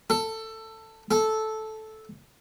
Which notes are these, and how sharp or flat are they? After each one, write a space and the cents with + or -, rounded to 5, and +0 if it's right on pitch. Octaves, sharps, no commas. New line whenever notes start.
A4 +15
A4 -10